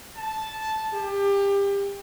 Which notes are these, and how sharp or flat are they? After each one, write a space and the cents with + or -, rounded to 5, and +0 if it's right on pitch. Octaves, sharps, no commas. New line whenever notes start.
A5 -10
G4 +25